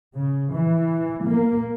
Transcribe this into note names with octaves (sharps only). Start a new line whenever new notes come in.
C#3
E3
A#3